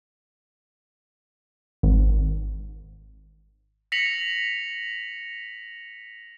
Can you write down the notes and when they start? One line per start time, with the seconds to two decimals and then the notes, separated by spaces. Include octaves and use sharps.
1.83 G#1
3.92 A#6 B6 C#7 F7 F#7